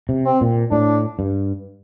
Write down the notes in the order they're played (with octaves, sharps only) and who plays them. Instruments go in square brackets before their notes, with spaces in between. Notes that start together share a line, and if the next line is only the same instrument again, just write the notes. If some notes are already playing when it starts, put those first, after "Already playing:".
[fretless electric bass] C3
[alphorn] C4
[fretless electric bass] A#2
[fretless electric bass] A2 [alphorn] D4
[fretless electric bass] G2